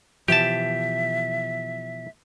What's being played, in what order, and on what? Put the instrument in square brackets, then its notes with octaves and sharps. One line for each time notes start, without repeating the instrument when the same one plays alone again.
[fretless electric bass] B2 E3 F3 [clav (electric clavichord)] G4 A5 [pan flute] E5